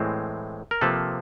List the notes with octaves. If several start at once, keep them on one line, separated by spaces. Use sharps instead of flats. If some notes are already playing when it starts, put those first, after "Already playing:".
Already playing: A2 E3 G#3 C4
A#4
C3 F3 A#3 A4 B4